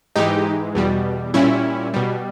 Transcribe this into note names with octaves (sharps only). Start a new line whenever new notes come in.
G#2 E3 G#3 D#4 G4
E2 B2 G3
A#2 G3 C#4 E4
B2 G3